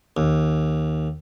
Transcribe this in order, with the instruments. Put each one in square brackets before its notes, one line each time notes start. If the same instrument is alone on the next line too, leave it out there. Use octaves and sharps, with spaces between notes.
[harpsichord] D#2